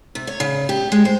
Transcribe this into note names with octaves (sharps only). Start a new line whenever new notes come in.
C3
C#5
C#3
G4
G#3
C5